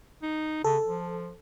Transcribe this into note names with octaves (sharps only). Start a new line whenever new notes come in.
D#4
C#3 A4
F3